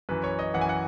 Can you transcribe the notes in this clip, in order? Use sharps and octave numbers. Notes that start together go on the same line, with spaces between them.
F#2 E3 B4
C#5
D#5
F#2 E3 F#5
G#5
F#5